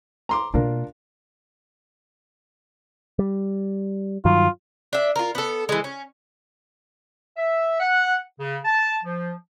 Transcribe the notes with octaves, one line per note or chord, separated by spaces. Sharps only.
A#5 C6 D6
B2 A#3 D4 F4 A#4
G3
G2 D#3 F#3 F4
D4 E5
F4 A#4
B3 A4
E3 G#3
C#4
E5
F#5
C#3
A5
F3